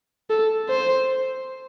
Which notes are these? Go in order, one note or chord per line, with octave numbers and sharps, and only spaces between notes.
A4
C5